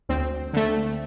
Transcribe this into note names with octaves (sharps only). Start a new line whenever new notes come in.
D2 C4
D3 A3